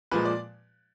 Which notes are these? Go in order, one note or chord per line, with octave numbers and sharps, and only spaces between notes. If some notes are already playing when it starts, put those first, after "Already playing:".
A#2 F3 G#3 B4
D5